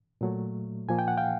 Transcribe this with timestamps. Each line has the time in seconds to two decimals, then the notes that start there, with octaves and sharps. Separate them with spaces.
0.21 A#2 F#3 A3
0.89 A#2 F3 A#3 G#5
0.99 G5
1.08 F#5
1.17 F5 G5